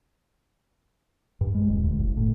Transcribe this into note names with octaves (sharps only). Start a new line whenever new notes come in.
G2
G#3
D#1
D2
F#1
A2